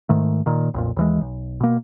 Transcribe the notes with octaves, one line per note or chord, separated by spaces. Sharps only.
G#2 D#3 A3
A#2 D#3
B1 F2 A#2
D#2 E3 G#3
B1
B2 A#3